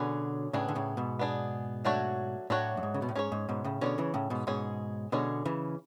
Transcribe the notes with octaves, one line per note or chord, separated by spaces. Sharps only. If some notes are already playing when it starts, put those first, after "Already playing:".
Already playing: B2 D3 F#3 C#4 G#4 B4
A2 C#3 B3 D4 G#4
D3
A2 C#3
G#2 B2
B3 D4 G#4
F#3 A3 D4 F#4 C#5
A2 F#3 A3 D4 F#4 C#5
F#2
G#2
C#3
B2
A2
G#2 C#4 G#4 C#5
G#2
G#2 B2
A2 C#3
B2 D3 C#4 G#4 C#5
C#3 E3
A2 C#3
G#2 B2
G#2 B2 G#3 C#4 G#4 C#5
B2 D3 G#3 C#4 G#4 C#5
C#3 E3